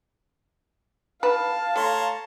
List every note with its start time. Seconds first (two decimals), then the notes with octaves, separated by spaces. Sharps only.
1.23 B4 F5 A5
1.76 A3 C#5 A#5 C6